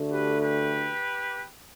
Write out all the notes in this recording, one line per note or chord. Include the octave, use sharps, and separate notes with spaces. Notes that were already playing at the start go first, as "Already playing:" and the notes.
Already playing: D2 D3 A3
G4 B4
G4 B4